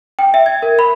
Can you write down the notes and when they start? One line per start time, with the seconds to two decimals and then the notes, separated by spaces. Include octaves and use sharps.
0.19 G5
0.34 E5
0.46 G#6
0.63 A#4
0.79 B5